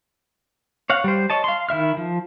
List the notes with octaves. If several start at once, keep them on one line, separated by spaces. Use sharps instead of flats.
C#5 F5 F#5
G3 C5
C#5 D#5 A5
F5 C6
D#3 E4 E5 F6
F3